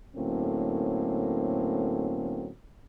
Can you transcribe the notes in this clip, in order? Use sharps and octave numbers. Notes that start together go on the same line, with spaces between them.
A2 D3 F#3 A#3 C4 C#4